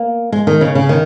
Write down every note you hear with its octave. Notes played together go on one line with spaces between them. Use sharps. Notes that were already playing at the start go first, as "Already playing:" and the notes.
Already playing: A#3
G#3
D#3
C#3
C#3
D#3